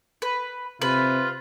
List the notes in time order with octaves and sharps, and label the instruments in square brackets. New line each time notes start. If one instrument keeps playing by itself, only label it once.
[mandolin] B4
[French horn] C3 [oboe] F4 [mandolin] B4